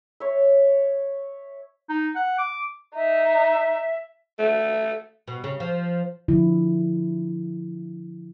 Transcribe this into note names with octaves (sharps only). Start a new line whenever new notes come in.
C#5 E5
D#4
F#5
D6
D#4 E5
A3
B2
C#3
F3
D3 F3 E4